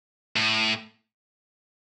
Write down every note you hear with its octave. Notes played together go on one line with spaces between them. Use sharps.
A2